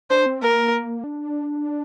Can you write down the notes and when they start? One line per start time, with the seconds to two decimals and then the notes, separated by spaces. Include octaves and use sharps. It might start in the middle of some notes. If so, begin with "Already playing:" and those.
0.10 D4 C5
0.26 C4
0.42 A#3 A#4
1.04 D4